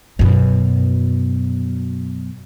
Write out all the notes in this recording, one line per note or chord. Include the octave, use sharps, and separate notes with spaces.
F#2 B2